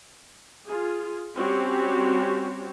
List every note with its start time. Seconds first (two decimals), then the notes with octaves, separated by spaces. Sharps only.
0.67 F4 G#4
1.36 G3 C4 C#4 F#4 G4 C#5